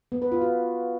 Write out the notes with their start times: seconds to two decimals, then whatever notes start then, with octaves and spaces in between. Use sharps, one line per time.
0.12 B3
0.22 B4
0.32 F4
0.42 F#4